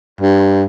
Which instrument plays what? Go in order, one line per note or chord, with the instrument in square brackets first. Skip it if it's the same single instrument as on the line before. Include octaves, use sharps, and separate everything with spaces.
[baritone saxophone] G2